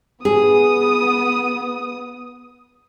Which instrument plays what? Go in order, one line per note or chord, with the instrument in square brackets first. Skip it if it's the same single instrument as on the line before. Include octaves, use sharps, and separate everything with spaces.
[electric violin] B3 D#6 [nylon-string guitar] G#4